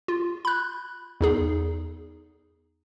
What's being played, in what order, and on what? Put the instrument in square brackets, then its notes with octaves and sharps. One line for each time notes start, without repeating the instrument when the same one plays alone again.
[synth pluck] F4
B5 F#6
E2 D#4 G#4